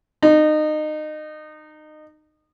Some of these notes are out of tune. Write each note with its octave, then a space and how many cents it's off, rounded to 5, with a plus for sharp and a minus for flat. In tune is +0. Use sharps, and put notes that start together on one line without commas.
D#4 -25